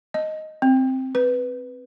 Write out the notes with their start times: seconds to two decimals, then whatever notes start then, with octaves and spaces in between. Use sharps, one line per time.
0.14 D#5
0.62 C4
1.15 B4